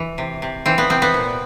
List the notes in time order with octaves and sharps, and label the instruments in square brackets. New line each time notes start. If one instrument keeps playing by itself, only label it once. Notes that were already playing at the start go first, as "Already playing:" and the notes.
Already playing: [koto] E3
C3
C3
E3 C4
B3
C3 C4
B3
A#2